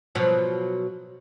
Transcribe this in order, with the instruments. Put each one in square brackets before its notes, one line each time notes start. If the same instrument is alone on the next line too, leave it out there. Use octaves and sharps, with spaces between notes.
[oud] B2 F3 F#3